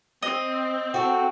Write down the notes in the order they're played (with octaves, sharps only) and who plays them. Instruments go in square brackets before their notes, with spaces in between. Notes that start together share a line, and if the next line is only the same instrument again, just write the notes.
[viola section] C4 [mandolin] D#5
[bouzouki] F#4 A4 [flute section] G5